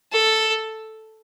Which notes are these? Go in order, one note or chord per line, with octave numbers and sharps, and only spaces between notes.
A4